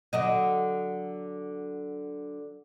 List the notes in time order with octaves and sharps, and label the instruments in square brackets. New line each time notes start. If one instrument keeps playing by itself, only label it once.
[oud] D3 F#3 D#5